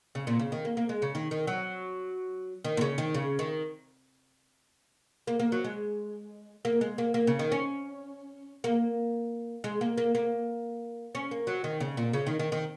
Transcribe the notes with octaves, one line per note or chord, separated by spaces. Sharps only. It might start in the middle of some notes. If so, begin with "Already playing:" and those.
C#3
A#2
C#3
D#3
A#3
A#3
G#3
C#3
D#3
D#3
F#3
D#3
A#2
C#3
D#3
C#3
D#3
A#3
A#3
F#3
G#3
A#3
G#3
A#3
A#3
C#3
D#3
C#4
A#3
G#3
A#3
A#3
A#3
C#4
A#3
F#3
D#3
C#3
A#2
C#3
D#3
D#3
D#3